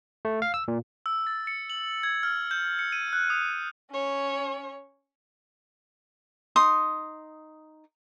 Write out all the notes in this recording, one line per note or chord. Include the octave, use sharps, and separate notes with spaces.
A3
F5
E6
A#2
E6
A6
C#7
F#7
G#6
F6
G6
C#7
D#7
F#6
D#6
C#4 C#5
D#4 C6 D#6